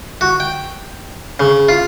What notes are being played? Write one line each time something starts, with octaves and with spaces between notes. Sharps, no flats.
F#4
G5
C#3
F4